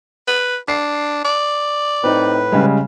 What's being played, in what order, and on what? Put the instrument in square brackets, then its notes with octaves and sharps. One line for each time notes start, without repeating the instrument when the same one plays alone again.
[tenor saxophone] B4
[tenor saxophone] D4 [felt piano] C7
[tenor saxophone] D5
[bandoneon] A2 B4 [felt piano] C4 D#4
[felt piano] C#3 G3 G#3